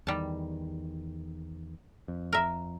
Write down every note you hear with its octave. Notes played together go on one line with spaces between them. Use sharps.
E2 D#3 G3 A5
F2
A#4 E5